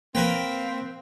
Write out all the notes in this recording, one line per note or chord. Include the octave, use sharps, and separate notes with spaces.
A#3 C4 A#4 B4 F5 G5